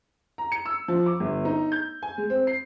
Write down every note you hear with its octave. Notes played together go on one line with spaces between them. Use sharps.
A#5
C#7
E6
F3
D6
G1
D#4
G6
G#5
G#3
C4
C7